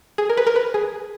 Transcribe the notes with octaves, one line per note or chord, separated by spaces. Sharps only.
G#4
A#4
B4
A#4
B4
G#4